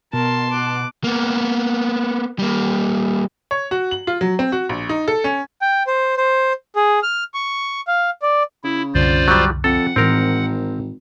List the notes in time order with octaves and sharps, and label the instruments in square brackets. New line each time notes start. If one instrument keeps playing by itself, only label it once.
[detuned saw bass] B2 [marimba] B3 [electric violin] A#4 [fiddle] A5 C6
[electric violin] D6 F#6
[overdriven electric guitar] A#3 B3
G3 A#3
[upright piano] C#5
F#4
F#7
F4
F#3
C4
F#4
A#1
D#4
A4
C#4
[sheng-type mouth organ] G5
C5
C5
G#4
F6
C#6
F5
D5
[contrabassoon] C#3 [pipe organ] E4
[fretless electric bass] C2 F#2 D3 [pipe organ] F4 C5 D5
[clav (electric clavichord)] F#3 G3
[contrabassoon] F2 [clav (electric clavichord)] A4 [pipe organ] F#5
[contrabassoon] G#1 [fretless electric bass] A2 E3 [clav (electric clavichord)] C4 A#4